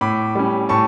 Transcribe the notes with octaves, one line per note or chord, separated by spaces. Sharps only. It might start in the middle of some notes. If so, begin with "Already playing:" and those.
A2 B5 D6
G3 C#4
A2 A5 C#6